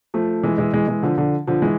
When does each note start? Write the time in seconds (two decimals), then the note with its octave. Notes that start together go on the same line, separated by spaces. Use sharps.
0.14 F3 A3
0.43 E3 G#3
0.58 E3 G#3
0.74 E3 G#3
0.88 E3 G#3
1.03 D3 F3
1.18 D3 F3
1.47 D3 F3
1.62 E3 G#3